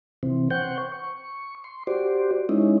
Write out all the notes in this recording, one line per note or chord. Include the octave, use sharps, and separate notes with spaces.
C3 E3 C4
C5 F#5 G5 C#6 G6
C#6
C6
F#4 G4 C5 D5
G#3 C#4 D#4 E4